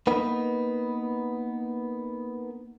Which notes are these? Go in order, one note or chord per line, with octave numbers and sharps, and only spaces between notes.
A#3 B3 D#4 B4